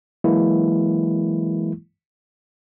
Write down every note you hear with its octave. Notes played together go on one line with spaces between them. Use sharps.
E3 F#3 G#3 A#3 E4